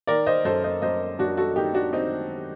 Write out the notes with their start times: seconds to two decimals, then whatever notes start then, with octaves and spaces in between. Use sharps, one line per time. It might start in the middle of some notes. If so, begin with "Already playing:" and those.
0.07 D#3 A#4 D5
0.26 C5 D#5
0.45 F#2 A4 C5
0.64 C5 D#5
0.82 F#2 C5 D#5
1.19 F#2 D4 F#4
1.37 F#4 A4
1.56 D#3 D#4 G4
1.74 D4 F#4
1.93 C4 D#4